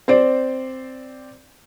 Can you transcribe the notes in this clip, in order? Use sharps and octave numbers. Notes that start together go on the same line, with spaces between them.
C4 C5 D5